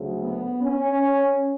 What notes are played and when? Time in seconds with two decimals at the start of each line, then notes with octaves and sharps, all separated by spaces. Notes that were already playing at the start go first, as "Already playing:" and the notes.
Already playing: D2 C#3 F#3
0.21 B3
0.63 C#4